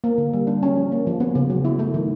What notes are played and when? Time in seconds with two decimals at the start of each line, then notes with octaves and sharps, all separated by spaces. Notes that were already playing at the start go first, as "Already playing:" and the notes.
0.04 A#3
0.18 D3
0.33 G3
0.47 D4
0.63 C#4
0.77 F3
0.92 A#3
1.07 F3
1.20 B3
1.35 C#3
1.50 F#3
1.65 E4
1.79 A3
1.94 D#3